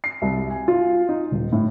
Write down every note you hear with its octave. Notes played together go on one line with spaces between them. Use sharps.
C7
C2
G#5
F4
D#4
D#1
A2